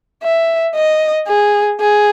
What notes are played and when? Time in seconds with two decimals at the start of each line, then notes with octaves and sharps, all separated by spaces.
0.23 E5
0.75 D#5
1.28 G#4
1.80 G#4